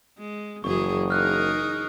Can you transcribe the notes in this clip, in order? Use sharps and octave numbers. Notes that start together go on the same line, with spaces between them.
G#3
F#1 F#2 E3 G#4 C#6
D#4 G#4 A#4 F6 F#6